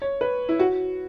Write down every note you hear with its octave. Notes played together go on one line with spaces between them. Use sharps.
C#5
B4
E4
F#4